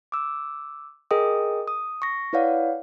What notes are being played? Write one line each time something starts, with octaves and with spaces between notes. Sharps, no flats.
D6 E6
G#4 A#4 D#5 G5 D#6
D#6
C#6 A#6
E4 B4 C#5 D5 F5 F#5